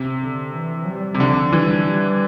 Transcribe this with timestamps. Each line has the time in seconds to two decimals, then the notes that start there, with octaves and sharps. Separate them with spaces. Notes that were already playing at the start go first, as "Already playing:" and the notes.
Already playing: C3
0.21 D3
0.54 E3
0.87 G3
1.15 C3
1.20 D3 F3
1.53 E3 G3
1.86 G3